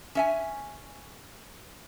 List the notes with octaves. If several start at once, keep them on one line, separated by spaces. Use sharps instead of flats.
C#4 E5 G#5